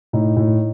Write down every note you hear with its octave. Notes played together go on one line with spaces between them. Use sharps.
A2 D#4
A2